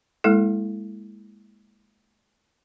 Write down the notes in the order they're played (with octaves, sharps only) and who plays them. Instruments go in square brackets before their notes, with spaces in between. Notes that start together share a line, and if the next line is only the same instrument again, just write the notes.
[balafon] G#3 A#3 E4 A4